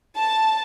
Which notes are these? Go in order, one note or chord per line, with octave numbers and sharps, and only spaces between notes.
A5